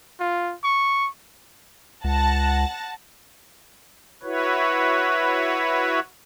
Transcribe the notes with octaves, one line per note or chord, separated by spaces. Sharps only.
F4
C#6
C#2 F#5 A5 A#6
E4 F#4 B4 C#5